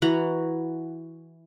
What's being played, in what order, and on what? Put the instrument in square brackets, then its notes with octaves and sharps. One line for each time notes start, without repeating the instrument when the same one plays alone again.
[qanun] E3 F#4 F#5 A#5